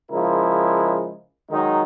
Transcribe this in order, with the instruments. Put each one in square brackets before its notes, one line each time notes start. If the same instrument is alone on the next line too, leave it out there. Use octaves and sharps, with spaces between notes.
[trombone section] C#3 F3 G#3 E4 A#4
D#3 F#3 G#3 D#4